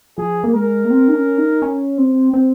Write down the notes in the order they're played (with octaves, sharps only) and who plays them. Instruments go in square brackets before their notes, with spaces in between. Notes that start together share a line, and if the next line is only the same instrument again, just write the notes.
[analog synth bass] F3 [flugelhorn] G#4
[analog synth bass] A#3
[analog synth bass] G#3 [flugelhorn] A#4
[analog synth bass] A#3
C4
D#4
C#4
D#4
C#4
C4
C4